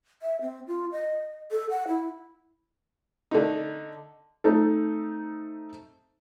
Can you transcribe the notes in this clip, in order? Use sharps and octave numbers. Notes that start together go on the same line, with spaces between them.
E5
C4
F4
D#5
A4
F#5
E4
D3 A3 D#4
A3 C4 D#4 A4